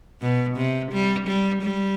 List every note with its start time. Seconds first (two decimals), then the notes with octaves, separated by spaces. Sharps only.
0.22 B2
0.57 C3
0.92 G3
1.27 G3
1.62 G3